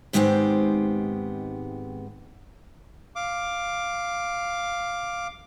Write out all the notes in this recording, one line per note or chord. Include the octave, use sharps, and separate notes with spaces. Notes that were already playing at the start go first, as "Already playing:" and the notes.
G#2 D#3 G#3 B3 C4 G4
F5 D6